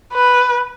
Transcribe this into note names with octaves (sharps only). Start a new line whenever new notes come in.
B4